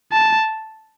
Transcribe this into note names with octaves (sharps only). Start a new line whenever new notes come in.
A5